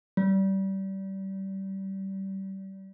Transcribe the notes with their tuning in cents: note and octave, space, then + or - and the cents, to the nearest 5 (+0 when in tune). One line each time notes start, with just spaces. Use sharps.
G3 -25